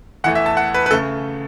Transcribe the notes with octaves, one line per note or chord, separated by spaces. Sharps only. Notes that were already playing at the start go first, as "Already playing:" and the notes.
E2 E3 A3 F#5
E5
A5
F#5
B4
B4
C#3 A3 A4